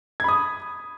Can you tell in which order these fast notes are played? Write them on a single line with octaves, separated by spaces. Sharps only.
G#6 B5 D#6